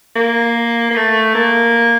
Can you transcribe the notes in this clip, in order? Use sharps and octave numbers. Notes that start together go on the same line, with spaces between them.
A#3
A#3
A3
A#3